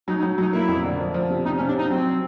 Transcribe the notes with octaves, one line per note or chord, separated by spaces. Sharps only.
F#3 D#4
D#4
F#3
F#3 D#4
A#3 E4
F2
D3
F3
F3
C3
C3 D#4
C#4
C3
D4
C3 D#4
F#3 C4